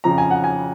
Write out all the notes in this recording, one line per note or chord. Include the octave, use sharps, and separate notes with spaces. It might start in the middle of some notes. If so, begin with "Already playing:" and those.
F2 C#3 F3 A#5
G#5
F#5
G#5